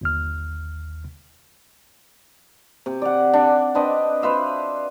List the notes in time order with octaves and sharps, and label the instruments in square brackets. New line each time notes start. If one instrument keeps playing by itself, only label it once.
[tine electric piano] G1 D#2 F6
[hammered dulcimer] C3
D5 F#5
D4
C4 D4 B4 D#5
B4 C5 E5 F5